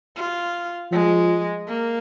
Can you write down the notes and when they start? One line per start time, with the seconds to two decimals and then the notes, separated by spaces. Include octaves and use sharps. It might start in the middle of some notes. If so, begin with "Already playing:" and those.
0.17 F4
0.91 F3 G#3
1.68 A#3